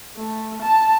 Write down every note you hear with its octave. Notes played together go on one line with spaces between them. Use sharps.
A3
A5